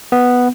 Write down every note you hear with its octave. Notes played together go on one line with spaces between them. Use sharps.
B3